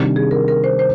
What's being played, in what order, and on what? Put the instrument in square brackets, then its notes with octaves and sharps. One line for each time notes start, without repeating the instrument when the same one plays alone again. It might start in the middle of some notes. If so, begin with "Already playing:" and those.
Already playing: [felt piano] C3 D#3 G3 D4
[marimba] G#4
A#4
A#4
C5
C5